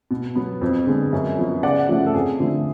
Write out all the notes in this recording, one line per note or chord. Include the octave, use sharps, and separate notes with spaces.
B2
F#3 B3
F2
D3 G#3 B3
F#2
F3 B3
C#3 D5 F#5
F3 A3 C#4
A4
F2 G#4
D3 F3 A3